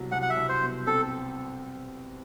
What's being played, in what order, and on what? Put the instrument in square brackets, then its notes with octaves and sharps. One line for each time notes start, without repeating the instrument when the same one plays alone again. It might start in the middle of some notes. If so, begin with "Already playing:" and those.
Already playing: [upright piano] C2 B2 F#3
[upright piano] C2 [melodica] F#5
[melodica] F#5
E5
[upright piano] C2
[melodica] C5
[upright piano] B2
[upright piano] C4 [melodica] A4